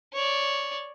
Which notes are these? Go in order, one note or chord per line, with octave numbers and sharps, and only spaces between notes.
C#5 D5